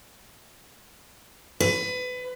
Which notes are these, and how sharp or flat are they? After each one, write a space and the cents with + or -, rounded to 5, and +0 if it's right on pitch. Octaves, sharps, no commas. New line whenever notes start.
B4 +25